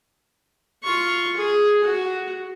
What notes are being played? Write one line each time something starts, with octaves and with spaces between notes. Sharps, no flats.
F4 C#6
G#4
F#4